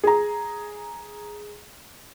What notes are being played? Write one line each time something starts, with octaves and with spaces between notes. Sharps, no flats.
G#4 A#5